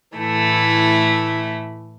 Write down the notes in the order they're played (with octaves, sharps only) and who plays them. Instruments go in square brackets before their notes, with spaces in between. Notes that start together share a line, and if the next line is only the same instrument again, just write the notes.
[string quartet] A2 E3 A3 E4